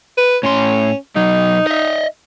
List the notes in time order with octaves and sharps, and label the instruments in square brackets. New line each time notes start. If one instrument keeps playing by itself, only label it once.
[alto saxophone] B4
[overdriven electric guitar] A2 C6 [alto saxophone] C#4
[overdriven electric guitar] B1 F#3 [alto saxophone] D#4
[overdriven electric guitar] D#5 E5